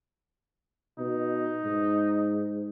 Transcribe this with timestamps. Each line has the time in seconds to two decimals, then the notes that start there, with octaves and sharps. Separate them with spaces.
0.99 B2 D#4
1.64 G#2